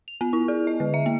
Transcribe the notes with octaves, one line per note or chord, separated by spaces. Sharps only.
F7
B3
E4
G#4
D#5
D3
E5
A#3